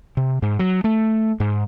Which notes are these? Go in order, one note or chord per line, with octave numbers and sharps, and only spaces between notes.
C3
G#2
F#3
A3
G#2